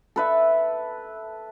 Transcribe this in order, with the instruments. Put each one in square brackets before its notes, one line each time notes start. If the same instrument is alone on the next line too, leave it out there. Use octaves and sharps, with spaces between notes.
[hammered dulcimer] A4 B4 E5